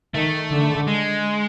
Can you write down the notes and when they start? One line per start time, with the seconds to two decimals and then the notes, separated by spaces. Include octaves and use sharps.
0.14 D#3 A3
0.51 D3
0.87 G#3